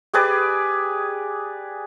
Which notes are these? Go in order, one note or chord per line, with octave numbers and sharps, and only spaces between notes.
G4 G#4 B4 D5